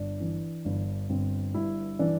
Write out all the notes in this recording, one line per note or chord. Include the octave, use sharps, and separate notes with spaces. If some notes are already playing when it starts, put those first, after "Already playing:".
Already playing: G1 D4
E3
G1 D4
G1 C4
G2 E4
E3 D4